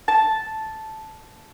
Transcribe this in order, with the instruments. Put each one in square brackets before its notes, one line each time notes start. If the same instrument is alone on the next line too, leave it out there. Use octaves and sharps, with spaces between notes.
[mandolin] A5